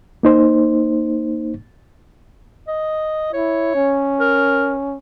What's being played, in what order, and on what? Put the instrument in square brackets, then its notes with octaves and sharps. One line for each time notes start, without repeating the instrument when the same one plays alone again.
[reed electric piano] A#3 D#4 C5
[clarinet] D#5
[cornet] E4 [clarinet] C#5
[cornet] C#4
[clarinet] A#4